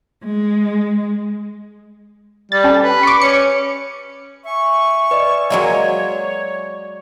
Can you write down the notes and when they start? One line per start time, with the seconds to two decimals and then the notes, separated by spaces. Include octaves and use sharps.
0.24 G#3
2.52 G3 A6
2.64 C#4 G4 A4
2.83 B4
3.03 C#6 D6
3.22 C#4 C#7
4.45 E5 G#5 C#6
5.11 B4 D5 D#5
5.50 F#3 G#3 A#3 C#5 D5 G#6